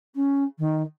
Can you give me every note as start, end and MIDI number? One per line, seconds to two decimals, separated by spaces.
0.15 0.43 61
0.58 0.82 51